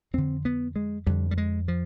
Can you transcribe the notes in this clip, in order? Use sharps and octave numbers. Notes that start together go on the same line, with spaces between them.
F2 D3 C4
B3
G#3
F2 D3 G3
G3
G#3
F3